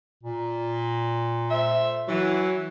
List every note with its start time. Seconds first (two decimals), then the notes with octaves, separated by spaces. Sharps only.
0.23 A#2
1.51 A3 C5 E5
2.09 E3 F#3